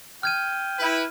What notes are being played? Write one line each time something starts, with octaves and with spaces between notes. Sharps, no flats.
G5 F6 G#6 D#7
E4 B4